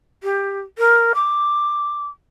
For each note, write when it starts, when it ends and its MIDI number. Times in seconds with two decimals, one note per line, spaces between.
0.23 0.60 67
0.78 1.13 70
1.15 2.07 86